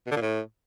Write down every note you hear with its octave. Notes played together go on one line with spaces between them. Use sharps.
B2
D3
A#2
A2